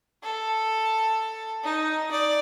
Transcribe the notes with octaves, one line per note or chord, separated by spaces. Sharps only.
A4
D#4
D5